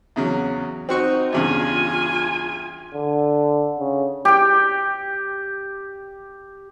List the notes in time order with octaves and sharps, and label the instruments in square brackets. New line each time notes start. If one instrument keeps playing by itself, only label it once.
[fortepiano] E2 C#3 F#3
[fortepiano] C4 F#4 C#6 [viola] D#4
[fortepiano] E2 G2 C#3 [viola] F4 G#5
[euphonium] D3
C#3
[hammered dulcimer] G4 G5